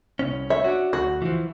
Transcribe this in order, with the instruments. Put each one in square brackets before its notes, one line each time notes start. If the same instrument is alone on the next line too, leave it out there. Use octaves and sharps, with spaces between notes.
[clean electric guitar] C2 C#4
[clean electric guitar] C#5 [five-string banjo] E5
[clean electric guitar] D4 F#4
[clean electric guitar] D2 [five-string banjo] F#4
[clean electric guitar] E3 F3